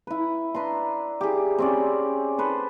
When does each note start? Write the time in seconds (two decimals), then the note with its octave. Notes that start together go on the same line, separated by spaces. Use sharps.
0.07 E4 B4
0.54 D4 B4 A#5 C6
1.21 G4 G#4
1.58 C4 C#4 D5
2.39 A4 B4 C5